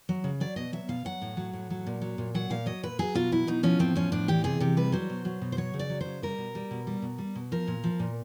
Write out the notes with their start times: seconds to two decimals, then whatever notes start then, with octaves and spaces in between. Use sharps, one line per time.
0.09 F#3
0.24 C#3
0.40 F#3 D5
0.56 B2 D#5
0.72 F#3 E5
0.89 B2 F5
1.05 F#3 F#5
1.22 A2
1.37 F#3
1.53 A2
1.70 F#3
1.86 A#2
2.01 F#3
2.18 A#2
2.34 F#3 F#5
2.50 A#2 F5
2.66 F#3 D#5
2.83 A#2 B4
2.99 F#3 G#4
3.15 B2 F4
3.32 F#3 E4
3.47 B2 D#4
3.63 F3 C#4
3.79 A2 C4
3.95 F3 C#4
4.12 A2 D4
4.28 E3 G4
4.44 C3 G#4
4.60 C3 G4
4.77 G3 B4
4.92 F#3 C5
5.10 B2
5.25 F#3
5.41 B2
5.52 C5
5.57 F#3 C#5
5.74 C#3
5.79 D5
5.90 F#3
6.01 C#3 C5
6.22 G3 A#4
6.38 B2
6.55 G3
6.71 B2
6.87 G3
7.02 B2
7.18 G3
7.35 B2
7.52 F3 A#4
7.68 A#2
7.84 F3
7.99 A#2